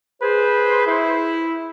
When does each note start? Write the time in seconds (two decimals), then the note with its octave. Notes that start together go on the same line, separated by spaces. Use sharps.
0.22 G#4 B4 C5
0.87 E4